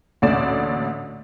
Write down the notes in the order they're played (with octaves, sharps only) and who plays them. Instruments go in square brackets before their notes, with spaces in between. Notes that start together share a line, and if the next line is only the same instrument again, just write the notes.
[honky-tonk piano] A1 D2 A#2 A3 D5 E7